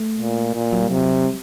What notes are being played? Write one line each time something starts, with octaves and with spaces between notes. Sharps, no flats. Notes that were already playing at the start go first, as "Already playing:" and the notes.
Already playing: A3
A#2
A#2 A#3
F#3
G3
C3 F#3
G3